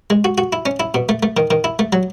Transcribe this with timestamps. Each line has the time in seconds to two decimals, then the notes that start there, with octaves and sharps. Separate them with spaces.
0.10 G#3
0.25 F#4
0.38 F#4
0.53 E4
0.66 C#4
0.80 E4
0.94 B2
1.09 A3
1.23 A3
1.37 D#3
1.51 D#3
1.64 E4
1.79 A3
1.93 F#3